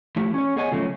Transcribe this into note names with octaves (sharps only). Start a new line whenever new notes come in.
F3 A3 E4 G4
C#4 C#5
B3 G#4 C#5 D#5 G#5
C#3 F3 F#3 A3